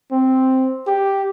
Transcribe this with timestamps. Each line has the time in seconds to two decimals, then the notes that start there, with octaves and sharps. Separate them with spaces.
0.12 C4
0.87 G4